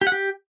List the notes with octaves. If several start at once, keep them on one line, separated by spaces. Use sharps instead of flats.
G4
F#5
G4